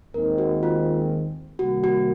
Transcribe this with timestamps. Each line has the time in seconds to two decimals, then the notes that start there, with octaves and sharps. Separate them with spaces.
0.14 D#2 D#3 G#3 C4 A#4
0.38 F#4
0.63 F4
1.59 C2 C3 D#3 A#3 F#4
1.84 F#4